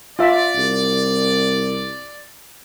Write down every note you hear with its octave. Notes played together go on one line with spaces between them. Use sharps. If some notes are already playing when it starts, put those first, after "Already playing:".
F4 D5 E5
C2